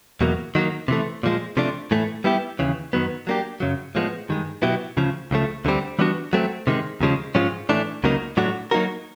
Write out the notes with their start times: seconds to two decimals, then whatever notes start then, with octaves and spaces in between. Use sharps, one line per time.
0.21 E2 B2 F#3 A#3
0.55 D#3 F#3 A#3
0.88 C3 E3 A3
1.23 A#2 F3 G#3
1.57 C3 F3 A3 D4
1.91 A2 E3 A3
2.24 G3 B3 E4 G4
2.59 D#2 C#3 E3
2.93 F#2 D#3 F#3 B3
3.27 F#3 A#3 D4 G4
3.60 F#2 C#3 F#3
3.95 A2 F3 G#3 B3
4.29 G2 D#3 G#3
4.62 B2 F#3 B3 E4 G4
4.97 D2 C#3 F3
5.31 C#2 C#3 F3 A3
5.65 D2 D3 G3 C4
5.99 E3 G3 B3 D4 F#4
6.33 F#3 A3 C4
6.67 C3 D#3 G#3
7.01 D#2 C#3 F3 G#3
7.35 G#2 F3 G#3 C#4 F4
7.69 A2 E3 A3 D4
8.04 C#2 C#3 F#3 A#3 D#4
8.37 A2 F#3 A3 D4 F#4
8.71 F#3 A#3 D#4 F#4 A#4